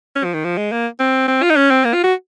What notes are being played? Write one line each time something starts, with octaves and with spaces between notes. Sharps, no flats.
C#4
F3
D#3
F3
G#3
A#3
C4
C4
F4
D#4
C#4
C4
A#3
F4
F#4